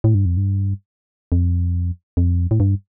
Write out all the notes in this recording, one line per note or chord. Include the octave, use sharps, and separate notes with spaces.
A2
G2
F2
G2
F2
F2
A2
G2